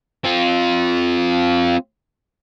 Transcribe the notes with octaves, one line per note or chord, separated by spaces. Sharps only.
C4 F4